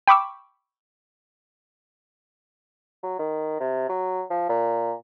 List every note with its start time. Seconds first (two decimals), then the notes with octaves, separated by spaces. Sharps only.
0.07 G5 B5 C#6 D6 E6
3.03 F#3
3.19 D#3
3.60 C3
3.89 F#3
4.30 F3
4.49 A#2